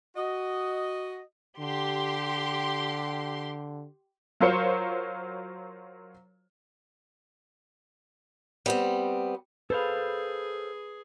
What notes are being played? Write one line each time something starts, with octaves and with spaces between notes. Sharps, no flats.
F#4 D#5
D3 G4 C6
F#3 F4 A#4 C5 C#5 C#7
G3 B3 C4
G#4 A4 B4 C5 F5